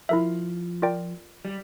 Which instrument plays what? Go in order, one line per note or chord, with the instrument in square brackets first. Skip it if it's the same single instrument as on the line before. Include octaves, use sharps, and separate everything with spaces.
[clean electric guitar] F3 [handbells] E4 A#4 E5
[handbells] F4 A#4 D5 G5
[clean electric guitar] G3